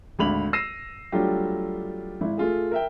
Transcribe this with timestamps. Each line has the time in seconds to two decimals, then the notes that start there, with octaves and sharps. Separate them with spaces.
0.19 G#1 D2 B5 F7 F#7
0.53 E6 A#6 C7 D#7 E7
1.12 F#3 G3 A3 D4 F4 G4
2.21 G#1 E4
2.38 A3 F4 G#4
2.72 A#4 E5 G5